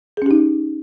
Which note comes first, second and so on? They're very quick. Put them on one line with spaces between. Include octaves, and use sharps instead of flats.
G#4 C#4 G4 D#4